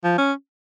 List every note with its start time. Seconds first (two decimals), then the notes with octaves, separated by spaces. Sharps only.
0.04 F3
0.18 C#4